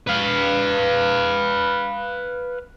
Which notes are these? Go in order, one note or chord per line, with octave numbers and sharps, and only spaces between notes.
B4 F5